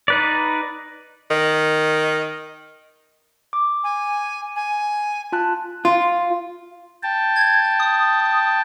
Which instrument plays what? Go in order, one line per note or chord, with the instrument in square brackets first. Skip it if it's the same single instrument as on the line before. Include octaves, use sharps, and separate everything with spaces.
[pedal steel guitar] D#4 B4 D5
[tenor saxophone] D#3
[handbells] D6
[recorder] G#5
G#5
[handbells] F4 A5 F#6
[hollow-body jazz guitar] F4
[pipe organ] G5 A5
[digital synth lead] G#6
D#6